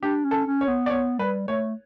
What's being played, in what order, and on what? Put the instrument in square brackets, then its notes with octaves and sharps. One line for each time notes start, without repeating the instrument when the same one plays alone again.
[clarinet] D4 [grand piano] G4
[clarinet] C#4
[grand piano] A4
[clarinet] C#4
[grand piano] C#5
[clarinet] B3
[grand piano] D5
[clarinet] B3 [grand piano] C#5
[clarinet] G3 [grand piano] B4
[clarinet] A3 [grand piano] C#5